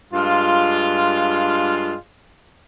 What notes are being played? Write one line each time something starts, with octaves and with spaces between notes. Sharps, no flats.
G2 G#3 F4